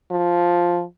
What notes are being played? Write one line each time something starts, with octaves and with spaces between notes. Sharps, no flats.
F3